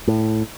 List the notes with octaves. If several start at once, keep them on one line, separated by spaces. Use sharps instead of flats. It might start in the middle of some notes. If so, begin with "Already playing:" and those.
A2